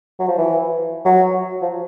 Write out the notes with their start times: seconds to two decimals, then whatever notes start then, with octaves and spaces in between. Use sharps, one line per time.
0.20 F#3
0.28 F3
0.38 E3
1.05 F#3
1.62 F3